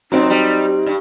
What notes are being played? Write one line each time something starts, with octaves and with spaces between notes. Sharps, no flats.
F#2 C3 F#3 C4 D#4
G3
G2